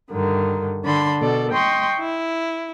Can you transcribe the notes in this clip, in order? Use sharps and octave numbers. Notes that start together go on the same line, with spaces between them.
G2 D3 D#3
D3 A5 B5 C6
B2 A4 D5
D#5 G5 C6 C#6
E4